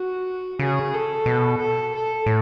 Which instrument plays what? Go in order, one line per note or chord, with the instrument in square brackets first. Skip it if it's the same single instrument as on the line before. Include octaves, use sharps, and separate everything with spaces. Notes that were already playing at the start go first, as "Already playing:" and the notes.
Already playing: [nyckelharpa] F#4
[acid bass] C#3 [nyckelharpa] G#4
[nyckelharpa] A4
[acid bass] B2
[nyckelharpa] A4
A4
[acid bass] A2